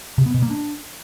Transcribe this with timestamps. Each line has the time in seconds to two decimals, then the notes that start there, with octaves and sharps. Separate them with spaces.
0.18 C3
0.26 B3
0.34 B2
0.42 A#3
0.51 D4